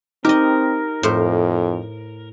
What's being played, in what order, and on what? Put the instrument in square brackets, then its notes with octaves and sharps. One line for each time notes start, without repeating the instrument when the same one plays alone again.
[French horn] C4 [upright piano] D#4 [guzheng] G4 D#5 [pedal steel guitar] A#4
[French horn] F2 [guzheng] A2 C5